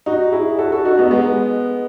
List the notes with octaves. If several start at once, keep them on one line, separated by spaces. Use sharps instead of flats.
D#4 F#4
E4 G#4
F#4 A4
F#4 A4
D#4 F#4
B3 D#4
G#3 B3